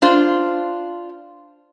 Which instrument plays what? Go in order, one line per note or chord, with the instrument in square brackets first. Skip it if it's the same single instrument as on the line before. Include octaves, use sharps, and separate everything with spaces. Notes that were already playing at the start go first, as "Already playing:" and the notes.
[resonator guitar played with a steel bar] D4 F4 C5